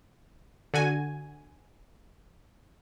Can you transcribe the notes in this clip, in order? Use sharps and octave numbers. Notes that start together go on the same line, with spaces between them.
D3 F#4 G#5